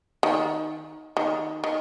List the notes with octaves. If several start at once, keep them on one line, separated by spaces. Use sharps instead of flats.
D#3
D#3
D#3